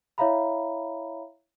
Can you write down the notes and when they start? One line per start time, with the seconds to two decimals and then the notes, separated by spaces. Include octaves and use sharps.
0.18 E4 C#5 E5 F5 A#5 B5